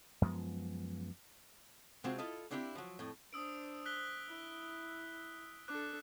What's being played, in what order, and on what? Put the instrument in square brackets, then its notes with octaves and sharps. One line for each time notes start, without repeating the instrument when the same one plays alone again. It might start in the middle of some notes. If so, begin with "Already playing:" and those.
[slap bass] F#2 F3 G#3 B3
[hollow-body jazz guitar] C3 G#3 C4 F4 F#4 G#4
E4 F4 A4 D#5
A#3 C4 D4 E4 G4
F3 F#3
F2 A2
[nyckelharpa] D4 C5 [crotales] D#6 E6 D7
[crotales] F#6 B6 G7
[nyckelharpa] E4
[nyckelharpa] D4 A4 [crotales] D6 F#6